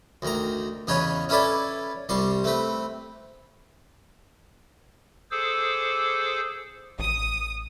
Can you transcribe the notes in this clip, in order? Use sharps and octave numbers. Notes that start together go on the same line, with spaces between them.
D2 D#3 A#5
E2 C#3 D#4 B4 C#5
C#4 E4 A4 B4 D5 A5
C2 G3 C6 C#6
A3 C4 B4
G#4 A4 C5 D6 E6
A1 D#6